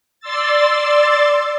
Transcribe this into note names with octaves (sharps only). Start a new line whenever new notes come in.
D5 C6 E6 A6